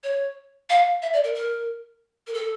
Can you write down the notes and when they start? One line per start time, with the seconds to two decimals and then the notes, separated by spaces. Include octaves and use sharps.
0.04 C#5
0.70 F5
1.02 E5
1.13 D5
1.24 A#4
1.35 A#4
2.27 A#4
2.34 A4